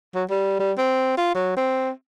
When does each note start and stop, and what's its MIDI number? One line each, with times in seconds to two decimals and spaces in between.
0.15 0.24 54
0.30 0.58 55
0.60 0.72 55
0.78 1.16 60
1.18 1.33 65
1.35 1.54 54
1.57 1.90 60